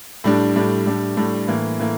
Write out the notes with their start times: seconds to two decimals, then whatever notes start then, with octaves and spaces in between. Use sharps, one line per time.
0.24 A2 G3 D4
0.56 A2 G3 D4
0.86 A2 G3 D4
1.17 A2 G3 D4
1.47 A2 E3 A#3
1.79 A2 E3 A#3